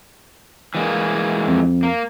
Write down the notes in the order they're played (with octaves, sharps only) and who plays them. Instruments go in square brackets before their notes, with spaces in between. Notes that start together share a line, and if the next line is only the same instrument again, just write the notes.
[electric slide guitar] E3 G#3 A#3
[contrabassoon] F2
[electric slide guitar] A#3